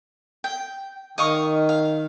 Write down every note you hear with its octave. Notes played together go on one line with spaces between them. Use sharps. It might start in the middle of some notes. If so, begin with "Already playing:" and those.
G5
D#3 D#5 F5 C#6
F5